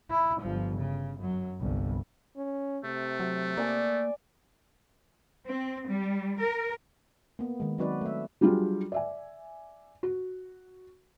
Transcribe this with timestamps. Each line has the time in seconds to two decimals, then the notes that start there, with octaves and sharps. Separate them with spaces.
0.10 E4
0.41 G1 F3
0.77 C#3
1.19 F#2 F#3
1.60 G1 C2
2.37 C#4
2.85 C3 A3
3.20 F#3
3.57 A#3 D5 G#5 D6
5.46 C4
5.86 G3
6.39 A#4
7.39 A#3 B3
7.60 D#3 G#3
7.78 F#3 C4 D#4 F#4 B4 D5
8.01 A3 E5
8.41 F#3 G3 D4 F4 F#4 G#4
8.92 D5 E5 G#5
10.03 F#4